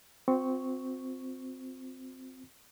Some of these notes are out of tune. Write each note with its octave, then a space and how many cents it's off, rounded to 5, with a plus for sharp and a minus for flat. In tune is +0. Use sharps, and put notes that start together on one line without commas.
C4 -10 F4 +45 C#6 +0